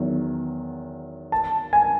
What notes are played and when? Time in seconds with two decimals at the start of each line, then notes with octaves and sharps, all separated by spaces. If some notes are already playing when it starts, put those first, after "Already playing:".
Already playing: E2 D#3 F#3
1.32 A5
1.73 G#5